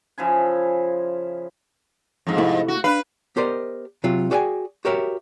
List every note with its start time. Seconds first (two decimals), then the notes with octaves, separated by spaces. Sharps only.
0.18 C#3 F3 E4 G#5
2.27 F2 G#2
2.38 C3 A3 E4
2.68 F#4
2.84 D4 B4 F5
3.36 B3 G4 A#4 C5 D5 D#5
4.04 C3 F#3 F4
4.31 F#4 G#4 D5 F5 G5 G#5
4.85 F#4 G4 A#4 C#5 E5